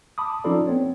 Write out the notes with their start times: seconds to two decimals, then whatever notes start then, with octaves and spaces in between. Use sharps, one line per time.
0.18 A5 B5 D6 D#6
0.44 F3 C#4 D#4 F4 A4 D5
0.67 B3 C4 C#5